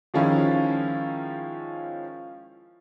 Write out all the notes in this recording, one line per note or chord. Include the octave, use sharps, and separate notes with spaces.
D#3 F3 G#3 C#4 E4 F4